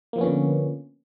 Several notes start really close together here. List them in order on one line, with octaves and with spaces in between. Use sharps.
A#3 F3 B3 C#4 D3